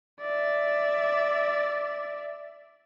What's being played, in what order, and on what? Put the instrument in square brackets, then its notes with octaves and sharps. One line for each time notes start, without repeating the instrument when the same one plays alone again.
[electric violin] D5 E5